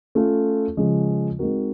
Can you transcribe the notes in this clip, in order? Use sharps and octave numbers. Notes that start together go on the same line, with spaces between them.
A3 C#4 F4 A4
C#3 F3 G#3 C#4
G#3 C4 D#4 F#4 A#4